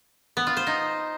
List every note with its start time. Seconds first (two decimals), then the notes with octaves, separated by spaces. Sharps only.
0.37 B3
0.47 F4
0.57 C5
0.67 D#4